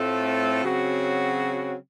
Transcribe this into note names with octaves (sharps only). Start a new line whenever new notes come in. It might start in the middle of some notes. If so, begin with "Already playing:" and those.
Already playing: A2 A3 C4 F4 A4
C#3 F#3 C4 F#4